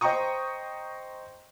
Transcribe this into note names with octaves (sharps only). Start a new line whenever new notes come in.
C5 D#5 G5 A#5 C#6 D#6